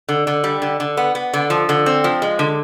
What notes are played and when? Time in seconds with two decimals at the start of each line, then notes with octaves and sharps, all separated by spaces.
0.09 D3
0.27 D3
0.44 G3
0.62 D3
0.80 D3
0.97 B3
1.15 B3
1.33 D3
1.50 F3
1.69 D3
1.86 C4
2.04 F3
2.22 G#3
2.39 D3